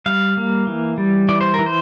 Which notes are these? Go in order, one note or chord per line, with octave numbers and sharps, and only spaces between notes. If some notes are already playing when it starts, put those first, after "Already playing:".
G3 F5
A#3
E3
G3
E3 D5
C5
E3 A#4
C5